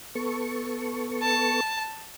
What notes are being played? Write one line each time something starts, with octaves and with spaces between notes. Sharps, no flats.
B3 A4 C#6
A5